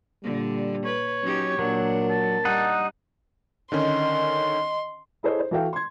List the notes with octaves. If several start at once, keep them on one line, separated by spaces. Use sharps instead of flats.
A#2 D3 G3
B4 C#5
F#3 C#4 D#4 G4
A#2 F#3 D4 A#4
A5
G3 D#4 F#5
D3 D#3 C#4 D#5 C6
E4 G#4 A4 C5 C#5 D#5
C5
E3 F#4 A4 F5 G5
C6 G#6